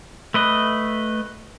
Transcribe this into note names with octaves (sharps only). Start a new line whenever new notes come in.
A3 B4 D#5